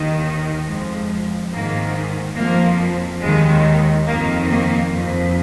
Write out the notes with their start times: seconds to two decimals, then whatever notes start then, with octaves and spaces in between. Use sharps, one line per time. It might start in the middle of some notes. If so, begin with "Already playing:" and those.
Already playing: D#2 D#3
0.67 F2 F3 G#3
1.51 G#2 D#3 A#3
2.36 F2 A#3
2.41 F3
3.21 D#2 D#3 G#3
4.07 F2 D#3 A#3
4.49 A#3
4.92 F2 F3